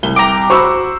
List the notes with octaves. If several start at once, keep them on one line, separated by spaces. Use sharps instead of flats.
C2 G7
G5 A#5 D6
F#4 C5 B5 C#6 E6